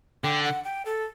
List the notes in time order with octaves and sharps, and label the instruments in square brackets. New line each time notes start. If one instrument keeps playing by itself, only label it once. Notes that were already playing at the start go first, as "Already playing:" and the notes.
[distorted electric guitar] D3 [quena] G5
[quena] F#5
G5
A4